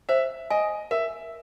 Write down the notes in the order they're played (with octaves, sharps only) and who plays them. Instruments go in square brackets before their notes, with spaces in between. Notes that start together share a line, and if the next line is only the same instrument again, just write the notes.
[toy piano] C5 [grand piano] E5
[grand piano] D#5 [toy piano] G#5
[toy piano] A#4 [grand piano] E5